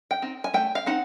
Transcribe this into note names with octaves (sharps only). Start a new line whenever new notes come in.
G5
C4 D#4
G#5
A3 G5
F5
C4 D#4 F#5